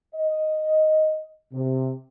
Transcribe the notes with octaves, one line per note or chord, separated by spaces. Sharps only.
D#5
C3